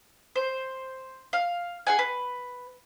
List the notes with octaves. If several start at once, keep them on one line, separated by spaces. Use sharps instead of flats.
C5
F5
G#4 F#5 G#5
B4